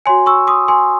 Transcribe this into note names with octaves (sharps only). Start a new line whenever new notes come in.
F#4 C#5 G#5 C6
C#6 E6
C6 D#6
G#5 C6